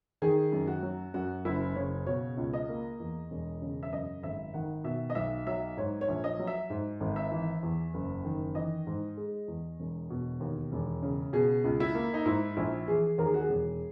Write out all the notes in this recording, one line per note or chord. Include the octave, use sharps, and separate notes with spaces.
D#3 G#4
F#2
F#4
F#3
F#2 F#4
F#1 E4
C#3 C#5
B2 C#5
C#2
D#5
A#3
E2
E1
C#3
E5
F#2 D#5
G#1 E5
D#3 F#5
B2 E5
D#5
B1 E5
F#3 E5
G#2 C#5
C#5
A#1
D#5
F#3
E5
G#2
G#1
E5
E3
E2
F#1
D#3
E3 D#5
G#2
G#3
E2
E1
B2
D#2
E1
C#3
B2 G#4
C#2
E4
A#3
D#4
G#2 E4
A#1 E4
E3 G#4
D#2 A#4
G#4
F#4
G#4
E1